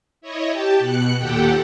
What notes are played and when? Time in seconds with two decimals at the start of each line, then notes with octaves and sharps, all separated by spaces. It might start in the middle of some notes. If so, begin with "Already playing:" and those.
0.21 E4 C#5 D#5
0.50 G4 G5 A5
0.79 B2 F#6 C#7
1.18 D#2 A#2 G4 A4 F#5 G5